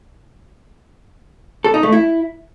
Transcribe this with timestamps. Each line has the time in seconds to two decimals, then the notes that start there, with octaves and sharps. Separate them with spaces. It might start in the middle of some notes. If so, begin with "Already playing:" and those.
1.64 A4
1.74 D#4
1.83 A3
1.92 E4